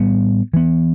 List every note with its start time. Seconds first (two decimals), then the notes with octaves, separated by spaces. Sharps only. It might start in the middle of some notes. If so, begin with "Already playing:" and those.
Already playing: A2 G3 B3
0.53 E3 B3